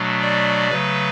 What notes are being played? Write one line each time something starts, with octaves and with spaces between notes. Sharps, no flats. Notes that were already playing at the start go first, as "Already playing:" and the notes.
Already playing: B2 F#3 A3 D4
D5
C#3 F#3 A3 B4